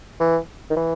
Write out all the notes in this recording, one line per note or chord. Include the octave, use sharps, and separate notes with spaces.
E3
D#3
E3